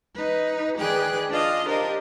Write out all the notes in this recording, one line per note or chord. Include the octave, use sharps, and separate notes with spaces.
D#4 B4
D#3 G#4 B4 D5 G5 F#6
D4 F4 D#5 F5
D4 G4 A#4 C5 D#5